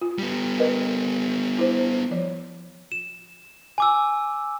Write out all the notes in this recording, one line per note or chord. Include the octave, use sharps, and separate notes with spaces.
F4
G3 B3
A#4 B4 D#5
E4 C5
F3 C#5
E7
G#5 D6 E6